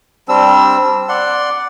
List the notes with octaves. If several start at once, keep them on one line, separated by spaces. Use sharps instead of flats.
G3 C4 D4 E6
D5 F#5 C6